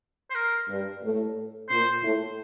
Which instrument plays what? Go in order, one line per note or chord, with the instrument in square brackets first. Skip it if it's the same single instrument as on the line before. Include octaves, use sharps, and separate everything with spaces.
[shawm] C5
A#4
[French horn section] G2 G3
A2 A3
[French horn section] A#2 A#3 [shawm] C5
[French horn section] A2 A3